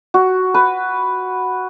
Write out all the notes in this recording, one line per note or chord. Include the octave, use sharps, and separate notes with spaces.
F#4
B4